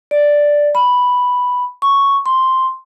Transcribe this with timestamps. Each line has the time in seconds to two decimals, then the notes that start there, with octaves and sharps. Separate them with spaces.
0.11 D5
0.75 B5
1.82 C#6
2.26 C6